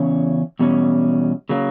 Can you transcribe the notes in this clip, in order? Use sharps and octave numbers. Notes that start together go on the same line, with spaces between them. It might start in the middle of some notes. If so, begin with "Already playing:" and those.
Already playing: E2 C#3 C#4
E2 B2 G3 C#4
C#3 F#3 A#3